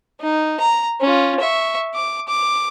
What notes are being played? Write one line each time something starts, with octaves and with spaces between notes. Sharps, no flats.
D#4
A#5
C#4 F4
E5 C#6
D6
D6